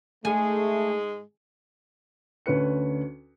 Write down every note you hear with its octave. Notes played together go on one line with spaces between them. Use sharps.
G#2 G#3 A3 G#4 G#5
D2 C#4 B4 C#7